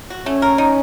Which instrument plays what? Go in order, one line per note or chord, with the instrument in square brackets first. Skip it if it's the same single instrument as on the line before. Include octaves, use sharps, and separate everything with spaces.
[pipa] F#4
[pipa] A3 [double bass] C#4
[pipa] A#4
D#4